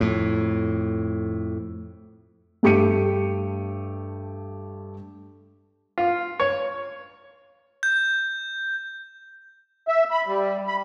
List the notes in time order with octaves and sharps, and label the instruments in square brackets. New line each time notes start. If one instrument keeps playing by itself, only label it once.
[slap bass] F2 A2
[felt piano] G2 A3 G4 D6 C#7 D#7
[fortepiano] F4
C#5
[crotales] G6
[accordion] E5
B5
G3
B5